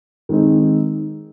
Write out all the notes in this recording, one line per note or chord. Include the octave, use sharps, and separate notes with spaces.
D#3 G#3 C4 D#4